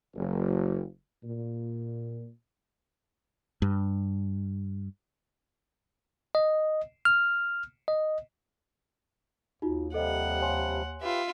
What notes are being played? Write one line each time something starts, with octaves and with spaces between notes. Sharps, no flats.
F#1
A#2
G2
D#5
F6
D#5
D#2 D#4 F4 F#4
C3 F3 G3 A4 D#5 F#5
C#5 G#5 C6
F4 G4 B4 E5